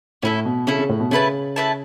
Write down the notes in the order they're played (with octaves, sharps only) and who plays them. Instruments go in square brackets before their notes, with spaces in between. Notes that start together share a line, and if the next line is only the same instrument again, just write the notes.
[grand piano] A2 [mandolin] C#4 E4 A4
[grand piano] B2
[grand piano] C#3 [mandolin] C#4 E4 A4
[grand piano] C#3
A2
B2
[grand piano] C#3 [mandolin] A3 E4 B4 A5
[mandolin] A3 E4 B4 A5